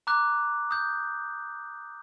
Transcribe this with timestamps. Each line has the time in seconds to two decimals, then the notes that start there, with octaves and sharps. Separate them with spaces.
0.07 A#5 D6 F#6
0.71 D#6 G6